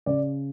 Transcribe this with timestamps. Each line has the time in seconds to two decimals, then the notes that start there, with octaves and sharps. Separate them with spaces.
0.06 C#3 D5